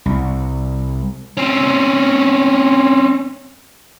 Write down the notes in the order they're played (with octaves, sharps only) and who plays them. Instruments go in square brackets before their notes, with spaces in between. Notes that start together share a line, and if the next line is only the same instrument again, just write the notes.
[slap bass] C2
[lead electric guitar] C4 C#4